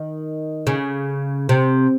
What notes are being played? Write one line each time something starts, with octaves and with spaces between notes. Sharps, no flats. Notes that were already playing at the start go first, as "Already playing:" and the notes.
Already playing: D#3
C#3
C3